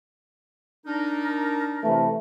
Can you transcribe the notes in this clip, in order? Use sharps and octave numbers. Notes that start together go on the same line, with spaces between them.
D4 D#4 A#4
C3 E3 A3